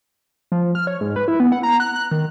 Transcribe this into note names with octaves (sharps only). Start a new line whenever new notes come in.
F3
F6
C#5
G#2
B4
E4
B3
F#5
A#5
F#6
F#6
D#3